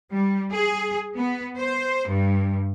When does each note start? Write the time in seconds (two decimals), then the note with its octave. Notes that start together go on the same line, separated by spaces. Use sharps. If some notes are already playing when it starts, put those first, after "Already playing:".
0.11 G3
0.52 G#4
1.16 B3
1.57 C5
2.08 G2